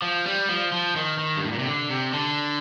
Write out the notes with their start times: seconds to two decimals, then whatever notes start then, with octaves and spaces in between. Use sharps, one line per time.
0.02 F3
0.26 G3
0.49 F3
0.72 F3
0.96 D#3
1.19 D#3
1.37 G2
1.45 A2
1.52 A#2
1.59 C3
1.66 D3
1.90 C3
2.13 D3